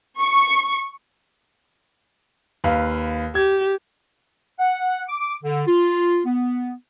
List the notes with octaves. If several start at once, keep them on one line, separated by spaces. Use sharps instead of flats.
C#6
D#2 B4 F5
G4 G#6
F#5
D6
D3
F4
B3